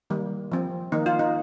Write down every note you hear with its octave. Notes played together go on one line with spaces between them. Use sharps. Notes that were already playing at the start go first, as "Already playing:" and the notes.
D#3 G3 A#3
F3 C4
D#3 A#3 D#4
F4
D#4